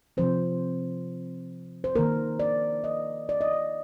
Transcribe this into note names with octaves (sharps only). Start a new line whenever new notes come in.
C3 F3 C4 C5
C5
D#3 A#3 A#4
D5
D#5
D5
D#5
D5